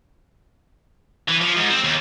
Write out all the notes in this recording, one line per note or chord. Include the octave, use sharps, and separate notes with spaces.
E3
F3
G#2
C4
D#2